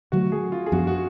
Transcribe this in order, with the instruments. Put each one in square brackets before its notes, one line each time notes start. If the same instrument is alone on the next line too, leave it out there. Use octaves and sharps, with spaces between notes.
[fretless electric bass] D3 F#3 A3 [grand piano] F#4
[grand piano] G#4
F4
G#4
[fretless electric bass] F#2 F3 B3 D4 [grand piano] F#4
[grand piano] F#4